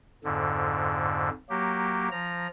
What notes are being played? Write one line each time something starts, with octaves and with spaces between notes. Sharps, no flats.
F2 G#2 D3
F#3 A#3 G4
F3 A#5